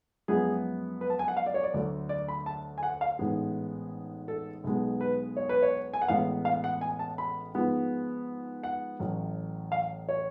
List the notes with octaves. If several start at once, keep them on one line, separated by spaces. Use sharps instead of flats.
F#2 F3 G#3 B3 G#4
B4
A5
G#5
F#5
F5
D5
C#5
D5
D2 D3 F#3 A3
D5
B5
A5
G#5
F#5
F5
A1 G#2 G#3 B3
A4
B1 B2 G#3 B3
B4
C#5
B4
C#5
G#5
F#5
A1 A2 G#3 B3 F5
F5
F#5
G#5
A5
B5
G#2 F3 G#3 B3
F#5
A1 A2 F#3
F5
C#5